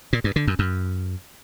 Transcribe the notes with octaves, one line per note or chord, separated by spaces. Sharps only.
A#2
G2
D3
F#2
F#2